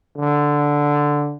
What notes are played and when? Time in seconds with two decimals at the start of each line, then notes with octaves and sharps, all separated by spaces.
0.18 D3